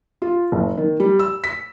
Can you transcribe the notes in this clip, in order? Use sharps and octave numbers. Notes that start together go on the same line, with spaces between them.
F4
F#1
D#3
G3
E6
B6